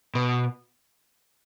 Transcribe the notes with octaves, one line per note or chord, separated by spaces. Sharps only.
B2